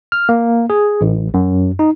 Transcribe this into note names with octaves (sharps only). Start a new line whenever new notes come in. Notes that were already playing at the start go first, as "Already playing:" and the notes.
F6
A#3
G#4
A1
F#2
D#4